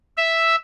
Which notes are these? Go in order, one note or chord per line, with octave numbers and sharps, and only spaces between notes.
E5